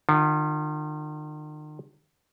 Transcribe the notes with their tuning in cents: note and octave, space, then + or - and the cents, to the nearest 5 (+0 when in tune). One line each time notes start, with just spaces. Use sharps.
D#3 -40 F4 +15